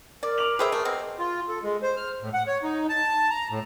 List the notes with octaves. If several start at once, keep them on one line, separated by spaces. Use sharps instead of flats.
A#4 D5
D6 F7 F#7
G#4 B4 C5 E5 G5 D6
A3 A#4
B2 C4
F4
A4
G#3
C5
F6
A2
F#5
C#5
D#4
A5
A#5
A2